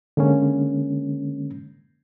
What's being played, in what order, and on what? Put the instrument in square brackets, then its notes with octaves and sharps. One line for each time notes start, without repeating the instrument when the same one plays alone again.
[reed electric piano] D3 G#3 A#3 C#4